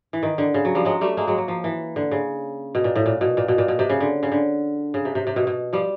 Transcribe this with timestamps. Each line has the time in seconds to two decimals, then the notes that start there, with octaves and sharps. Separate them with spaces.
0.13 E3
0.23 D#3
0.38 D3
0.54 C#3
0.65 F#3
0.75 F3 G3
0.85 F#3 G#3
1.01 G3 A3
1.17 G#3 A#3
1.27 F#3 G#3
1.38 F#3
1.48 F3
1.64 E3
1.96 D3
2.11 C#3
2.75 B2
2.84 A#2
2.96 A2
3.06 A#2
3.21 B2
3.37 A#2
3.48 B2
3.58 A#2
3.68 B2
3.79 C3
3.89 C#3
4.00 D3
4.23 C#3
4.32 D3
4.94 C#3
5.05 C3
5.15 C3
5.27 C3
5.36 B2
5.47 B2
5.73 F3 G3